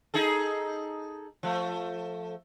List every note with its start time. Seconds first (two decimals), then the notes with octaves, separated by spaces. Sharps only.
0.14 D#4 G#4 A4
1.43 F3 A3